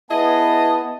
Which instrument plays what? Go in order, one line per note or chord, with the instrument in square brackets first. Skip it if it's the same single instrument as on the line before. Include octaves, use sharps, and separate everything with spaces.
[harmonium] B3 [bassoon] E4 [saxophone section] G#4 D#5 [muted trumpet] A5